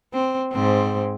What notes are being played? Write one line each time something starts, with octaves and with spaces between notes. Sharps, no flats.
C4
G#2 C4